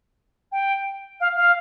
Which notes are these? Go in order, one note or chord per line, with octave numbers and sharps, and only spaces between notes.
G5
F5
F5